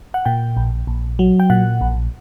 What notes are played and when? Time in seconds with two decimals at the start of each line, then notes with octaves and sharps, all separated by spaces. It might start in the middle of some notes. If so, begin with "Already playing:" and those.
0.14 F#5
0.25 A#2 G5
0.57 A#1
0.87 A#1
1.19 F#3
1.40 G5
1.50 A#2 F#5
1.81 A#1